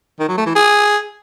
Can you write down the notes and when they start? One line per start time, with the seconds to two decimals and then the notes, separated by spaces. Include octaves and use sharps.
0.20 D#3
0.29 F#3
0.37 A3
0.46 E3
0.55 G#4